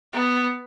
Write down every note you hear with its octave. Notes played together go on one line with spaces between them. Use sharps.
B3